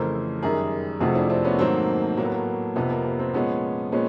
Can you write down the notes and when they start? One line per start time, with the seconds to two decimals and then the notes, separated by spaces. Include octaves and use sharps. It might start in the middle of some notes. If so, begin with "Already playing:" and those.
Already playing: F2 C#3 E3 A3 A#4 C5
0.42 F#2 D#3 G3 G#4 A#4
1.01 F2 C3 F3 A3 F#4 G#4
1.15 D4 E4
1.30 C4 D4
1.45 B3 C#4
1.59 G#2 D#3 F#3 A3 A#3 C4
2.17 A2 F#3 A3 A#3
2.25 B3
2.32 A#3
2.76 F2 C3 F3 B3
2.90 A#3
3.04 B3
3.19 A#3 C4
3.34 A#2 F3 G#3 B3 C#4
3.92 A#2 F3 G#3 B3 C#4